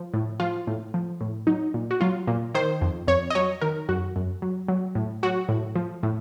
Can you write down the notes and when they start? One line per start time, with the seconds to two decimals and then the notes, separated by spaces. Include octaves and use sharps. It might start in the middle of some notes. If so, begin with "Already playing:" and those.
Already playing: F3
0.14 A2
0.40 F3 F4
0.67 A2
0.94 F3
1.21 A2
1.47 F#3 D#4
1.74 A#2
1.91 F#4
2.01 F#3 F4
2.27 A#2
2.55 D#3 C5
2.81 F2
3.08 F2 C#5
3.30 D#5
3.35 F#3 C#5
3.61 D#3 A#4
3.88 F#2 F#4
4.16 F#2
4.42 F#3
4.68 F#3
4.95 A2
5.23 F#3 F#4
5.49 A2
5.76 F3
6.03 A2